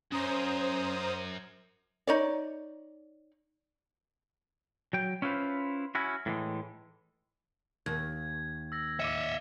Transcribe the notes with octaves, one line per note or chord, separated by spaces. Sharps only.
F#2 C#4 C5 A#5 D#6
D#4 C#5 D5
F#3 G5
C#4 E4 F4 B4 C5
C#4 E4 F#4
A2 E3 G#3
D#2 G#6
E6 A6 A#6
D#5 E5 D6 C#7